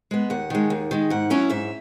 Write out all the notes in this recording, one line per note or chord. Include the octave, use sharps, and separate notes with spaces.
G#3 B3
D#2 F#5
D#3 G#3
D#2
D#3 G#3
G#2 F#5
F#3 C#4 E4
G#2 E5